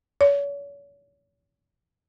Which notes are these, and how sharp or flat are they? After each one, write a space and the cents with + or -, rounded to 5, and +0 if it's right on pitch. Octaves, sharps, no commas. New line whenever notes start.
C#5 +40